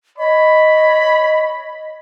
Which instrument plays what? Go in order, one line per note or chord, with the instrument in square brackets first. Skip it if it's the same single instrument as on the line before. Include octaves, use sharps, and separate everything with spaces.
[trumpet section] C#5 B5 [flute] D#5